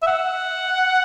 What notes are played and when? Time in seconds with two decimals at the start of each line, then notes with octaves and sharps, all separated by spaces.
0.02 E5
0.07 F#5